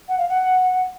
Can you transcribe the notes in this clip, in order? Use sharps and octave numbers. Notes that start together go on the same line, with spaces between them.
F#5
F5
F#5